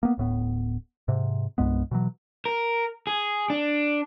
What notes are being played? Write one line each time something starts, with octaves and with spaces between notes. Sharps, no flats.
A#3 B3
D1 A2 B3
G#2 C3
C2 G2 G#3 B3
B2 E3 F#3
A#4
G#4
D4